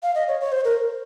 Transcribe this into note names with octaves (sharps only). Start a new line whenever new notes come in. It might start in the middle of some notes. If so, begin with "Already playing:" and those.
F5
D#5
C#5
C#5
C5
A#4